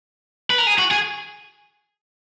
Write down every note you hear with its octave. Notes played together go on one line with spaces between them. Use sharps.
B4
A#4
G#4
F#4
G#4